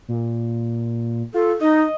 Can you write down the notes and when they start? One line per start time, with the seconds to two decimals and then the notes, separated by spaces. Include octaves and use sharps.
0.08 A#2
1.34 F4 A4
1.61 D#4 D#5